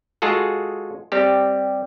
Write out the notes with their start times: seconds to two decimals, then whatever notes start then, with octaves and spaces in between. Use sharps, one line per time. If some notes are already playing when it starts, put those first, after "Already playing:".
0.22 G#3 F4 F#4 G#4 A4
1.12 G3 C4 G4